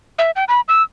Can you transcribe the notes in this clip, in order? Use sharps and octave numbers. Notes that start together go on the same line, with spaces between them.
E5
G5
B5
E6